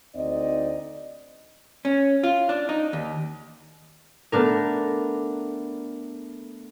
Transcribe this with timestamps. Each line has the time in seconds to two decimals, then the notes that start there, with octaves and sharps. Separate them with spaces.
0.14 D2 C4 D#4 D5 D#5
1.85 C#4
2.23 F4
2.49 D4
2.69 D#4
2.93 D#2
4.32 A3 B3 D4 A#4